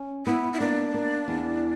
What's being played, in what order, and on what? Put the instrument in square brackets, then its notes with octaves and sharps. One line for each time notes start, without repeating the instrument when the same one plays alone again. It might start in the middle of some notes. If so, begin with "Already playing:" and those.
Already playing: [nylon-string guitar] C#4
[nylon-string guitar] B3 [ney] E4
[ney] E4
[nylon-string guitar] A#3 [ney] D4
[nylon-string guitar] A#3
E2